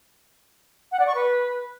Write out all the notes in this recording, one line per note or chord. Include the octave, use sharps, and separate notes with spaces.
F#5
D5
C#6
B4